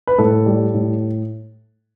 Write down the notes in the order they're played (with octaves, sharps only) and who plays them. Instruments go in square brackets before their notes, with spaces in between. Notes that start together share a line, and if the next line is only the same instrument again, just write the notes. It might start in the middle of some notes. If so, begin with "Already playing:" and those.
[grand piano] B4
A2 A4
G3
A2